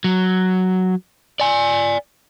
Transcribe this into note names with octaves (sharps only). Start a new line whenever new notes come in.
F#3
D5 G#5